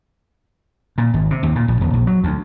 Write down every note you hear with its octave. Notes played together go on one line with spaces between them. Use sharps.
A#2
G#1
C3
D#2
A#2
A#1
D#1
A#1
F#3
D2